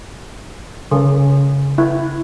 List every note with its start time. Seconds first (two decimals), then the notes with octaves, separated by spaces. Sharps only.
0.91 C#3
1.78 E4